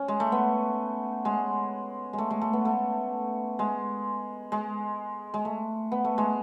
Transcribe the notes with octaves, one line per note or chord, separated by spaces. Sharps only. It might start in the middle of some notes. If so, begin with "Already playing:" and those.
Already playing: C#4
G#3
A3
B3
G#3
G#3
A3
G#3
A3
B3
A3
G#3
G#3
G#3
A3
B3
A3
G#3